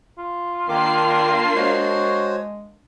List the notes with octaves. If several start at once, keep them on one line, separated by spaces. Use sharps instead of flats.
F4
D#3 A#3 D4 D6 C7
G#3 F#4 C5 C#5